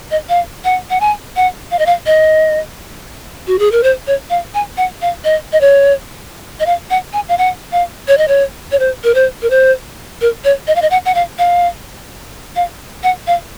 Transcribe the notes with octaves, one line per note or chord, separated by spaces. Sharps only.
D#5
F5
F#5
F#5
G#5
F#5
F5
D#5
F5
D#5
F#4
G#4
A#4
C5
C#5
F5
G#5
F#5
F5
D#5
D#5
C#5
D#5
F5
F#5
G#5
F5
F#5
F5
C#5
D#5
C#5
C#5
C5
A#4
C5
A#4
C5
A#4
C#5
D#5
F5
D#5
F#5
F#5
F5
F5
F5
F#5
F5